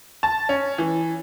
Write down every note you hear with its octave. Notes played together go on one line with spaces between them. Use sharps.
A5
C#4
E3